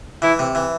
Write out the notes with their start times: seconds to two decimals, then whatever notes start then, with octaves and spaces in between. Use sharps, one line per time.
0.22 E3 E4
0.39 C3
0.55 E3